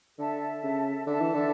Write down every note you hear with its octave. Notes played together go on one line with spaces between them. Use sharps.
D3 A4 E5 A5
C#3
D3 A4 E5 A5
E3
D3